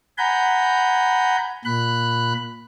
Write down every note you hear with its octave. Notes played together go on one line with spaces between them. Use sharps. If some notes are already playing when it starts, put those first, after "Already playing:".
F#5 G#5 A#5 B5 G6
A#2 B5 F#6